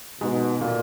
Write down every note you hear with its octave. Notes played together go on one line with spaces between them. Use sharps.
G#2 B2
A#2